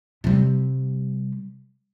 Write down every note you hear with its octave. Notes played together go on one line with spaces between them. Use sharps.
C3 G3